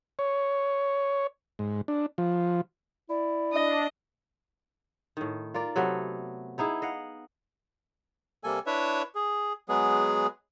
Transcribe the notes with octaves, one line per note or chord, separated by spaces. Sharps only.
C#5
G#2
D4
F3
E4 D5
D4 D#5
A2 D#3
F4 A#4 D5
C3 F#3 A3 B3
B3 D#4 E4 G#4
D#5 F5 F#5
C3 G3 A#3 A4 G#5
D4 E4 B4 C#5 E5
G#4
F#3 G#3 B3 G#4